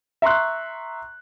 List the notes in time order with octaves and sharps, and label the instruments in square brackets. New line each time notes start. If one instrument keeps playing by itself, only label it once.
[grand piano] E5 A#5 C6 C#6 F#6